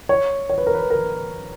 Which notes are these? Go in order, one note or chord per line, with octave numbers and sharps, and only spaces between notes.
C#5
C#5
B4
A#4
B4
A#4